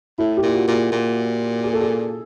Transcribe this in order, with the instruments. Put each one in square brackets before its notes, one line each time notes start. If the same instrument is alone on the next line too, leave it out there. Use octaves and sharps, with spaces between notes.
[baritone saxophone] A2 [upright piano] E4
[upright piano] G4
[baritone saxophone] A#2 [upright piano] F4
[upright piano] F#4
[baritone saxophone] A#2
[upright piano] G#4
[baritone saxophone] A#2
[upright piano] G#4
A4
G#4